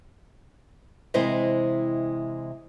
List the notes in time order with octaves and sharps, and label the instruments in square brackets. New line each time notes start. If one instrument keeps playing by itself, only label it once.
[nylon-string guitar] C3 E3 G#3 E4 C5 D#5